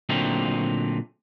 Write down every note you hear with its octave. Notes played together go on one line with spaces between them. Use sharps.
A#2 D3 F#3 A3 C4 D#4